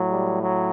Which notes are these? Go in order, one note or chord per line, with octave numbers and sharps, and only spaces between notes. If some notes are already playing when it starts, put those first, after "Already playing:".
Already playing: A2 F#3
G3
F#3